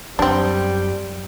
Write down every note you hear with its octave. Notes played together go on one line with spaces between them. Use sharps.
F#2 G3 C4 D4